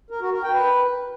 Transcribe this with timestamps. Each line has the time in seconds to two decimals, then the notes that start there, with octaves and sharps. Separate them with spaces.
0.10 A#4
0.21 F#4
0.32 A#4
0.43 G5
0.53 B4